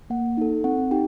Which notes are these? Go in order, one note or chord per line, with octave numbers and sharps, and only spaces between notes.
A#3 F#5
D#4 A4
C4 F#5
D#4 G4 G5